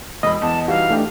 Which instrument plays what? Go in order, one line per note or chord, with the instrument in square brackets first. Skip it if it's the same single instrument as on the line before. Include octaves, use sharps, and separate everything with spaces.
[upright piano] E1 B5 [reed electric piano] D#5
[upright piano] E2 [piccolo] A5
[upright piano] E3 G3 D#4 [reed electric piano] F#4 [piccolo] F5
[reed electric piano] A3 D4 G4